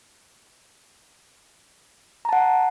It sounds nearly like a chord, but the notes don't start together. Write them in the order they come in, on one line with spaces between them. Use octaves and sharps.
A#5 A5 F#5